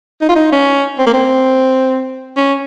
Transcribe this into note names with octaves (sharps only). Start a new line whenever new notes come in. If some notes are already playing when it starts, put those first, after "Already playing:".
D#4
F4
D#4
C#4
C4
A#3
C4
C#4